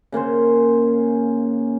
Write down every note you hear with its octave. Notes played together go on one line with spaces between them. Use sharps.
C#3 A#3 C#4 C5